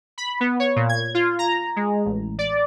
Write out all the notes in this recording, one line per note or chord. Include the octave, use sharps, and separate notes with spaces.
B5
B3
C#5
A#2
G#6
F4
A#5
G#3
A1
D5